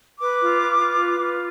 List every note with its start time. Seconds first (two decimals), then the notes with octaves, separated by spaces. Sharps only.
0.20 B4 D6
0.40 F4
0.61 B4
0.79 F4
1.00 B4
1.20 F4